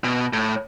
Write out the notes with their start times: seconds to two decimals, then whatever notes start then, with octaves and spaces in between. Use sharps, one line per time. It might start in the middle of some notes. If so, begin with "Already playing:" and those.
0.04 B2
0.33 A2